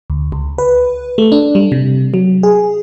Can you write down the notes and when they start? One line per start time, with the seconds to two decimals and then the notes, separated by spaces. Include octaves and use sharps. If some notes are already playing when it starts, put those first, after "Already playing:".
0.10 D2
0.32 C#2
0.58 B4
1.18 A3
1.32 D4
1.55 G3
1.72 C3
2.14 F#3
2.43 G#4